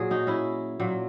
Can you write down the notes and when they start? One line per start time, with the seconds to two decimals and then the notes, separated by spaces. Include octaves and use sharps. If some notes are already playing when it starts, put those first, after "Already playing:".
Already playing: A#2 F#3 G#4
0.10 D#4 F#4
0.27 C#4 E4
0.80 A#2 F#3